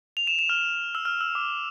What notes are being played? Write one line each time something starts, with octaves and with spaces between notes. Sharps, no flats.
F7
E7
E7
F6
E6
F6
E6
D6